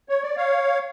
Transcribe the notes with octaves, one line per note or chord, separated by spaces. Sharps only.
C#5
D5
C#5 F5